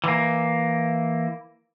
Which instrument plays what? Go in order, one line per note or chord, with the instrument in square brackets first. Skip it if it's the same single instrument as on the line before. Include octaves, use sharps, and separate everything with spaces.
[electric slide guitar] E3 A#3